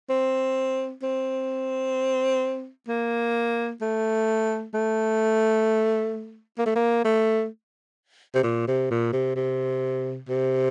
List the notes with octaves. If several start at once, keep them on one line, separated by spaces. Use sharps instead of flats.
C4
C4
A#3
A3
A3
A#3
A3
A#3
A3
C3
A#2
C3
A#2
C3
C3
C3